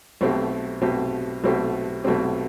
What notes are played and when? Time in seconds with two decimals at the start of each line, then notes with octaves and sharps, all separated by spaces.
0.21 B1 B2 A3 C4 G4
0.81 B1 B2 A3 C4 G4
1.44 B1 B2 A3 C4 G4
2.04 B1 B2 A3 C4 G4